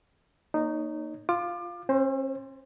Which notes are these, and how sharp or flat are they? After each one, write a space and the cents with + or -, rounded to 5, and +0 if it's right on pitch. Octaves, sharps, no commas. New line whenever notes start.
A#3 +0 D#4 -10 C#5 +20
F4 +0 D6 +30
C#4 -45 C5 +0